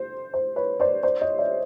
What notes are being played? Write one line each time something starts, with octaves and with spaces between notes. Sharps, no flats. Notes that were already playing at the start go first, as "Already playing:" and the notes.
Already playing: C5
C5
B4 C#5
C5 D5
C5 D5
C#5 D#5
D5 E5